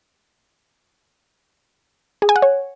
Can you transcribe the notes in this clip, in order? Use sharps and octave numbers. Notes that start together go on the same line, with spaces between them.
G#4
G#5
F#5
C#5